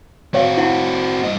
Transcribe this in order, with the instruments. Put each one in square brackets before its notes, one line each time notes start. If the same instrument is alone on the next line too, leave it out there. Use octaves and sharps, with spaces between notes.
[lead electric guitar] C4 F#4 [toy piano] C#5 F5
[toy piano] E4 F#5 A5
[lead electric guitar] G2 D#5